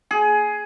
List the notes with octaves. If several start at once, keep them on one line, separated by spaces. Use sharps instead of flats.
G#4